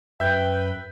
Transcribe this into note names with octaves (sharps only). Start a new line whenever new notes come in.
F#2 B4 E5 G5 G6